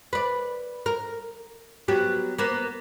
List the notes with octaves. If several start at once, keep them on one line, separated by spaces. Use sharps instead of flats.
B4 D5
A#4
F#3 B3 G4
A#3 B3